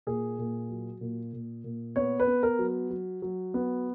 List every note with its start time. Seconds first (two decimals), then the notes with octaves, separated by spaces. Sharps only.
0.07 A#2 G#4
0.38 A#2
0.70 F#3
1.01 A#2
1.33 A#2
1.64 A#2
1.96 B3 C#5
2.20 B4
2.27 B3
2.43 A#4
2.59 F#3
2.90 F#3
3.22 F#3
3.54 B3